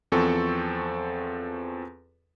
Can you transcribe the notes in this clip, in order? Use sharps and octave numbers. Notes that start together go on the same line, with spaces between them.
E2 F3 C4 A4 C#6